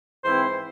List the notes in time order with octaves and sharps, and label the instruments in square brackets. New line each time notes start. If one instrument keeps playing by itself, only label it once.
[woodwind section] G#2 E3 C4 E4 C5